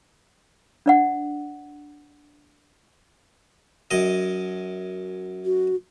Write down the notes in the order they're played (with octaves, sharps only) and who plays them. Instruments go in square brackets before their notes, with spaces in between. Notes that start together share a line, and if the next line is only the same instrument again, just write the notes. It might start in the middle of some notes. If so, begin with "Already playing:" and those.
[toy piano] D4 D5 F#5
[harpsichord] F#2 D#5
[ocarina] F#4